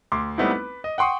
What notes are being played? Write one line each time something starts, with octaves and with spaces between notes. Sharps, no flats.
D2 C6 D6
G3 A3 B3 C4 D#4 E4
B4
D#5
F#5 G5 C6 C#6 D#6